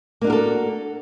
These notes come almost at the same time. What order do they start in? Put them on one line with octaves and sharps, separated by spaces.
A#3 D4 F#4 A#4 A4